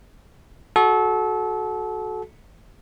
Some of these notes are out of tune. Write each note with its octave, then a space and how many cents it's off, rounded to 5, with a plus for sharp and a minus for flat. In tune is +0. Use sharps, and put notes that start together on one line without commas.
F#4 +0 A4 -30